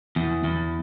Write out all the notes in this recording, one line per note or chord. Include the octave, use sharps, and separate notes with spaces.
E2
E2